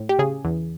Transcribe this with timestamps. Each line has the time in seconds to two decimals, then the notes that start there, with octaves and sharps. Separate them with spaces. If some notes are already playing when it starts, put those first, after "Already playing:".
Already playing: A2
0.09 G4
0.19 C#3 G#4
0.45 E2